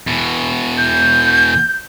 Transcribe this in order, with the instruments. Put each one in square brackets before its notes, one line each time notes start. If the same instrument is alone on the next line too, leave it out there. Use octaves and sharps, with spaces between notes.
[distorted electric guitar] E2 B2
[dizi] G6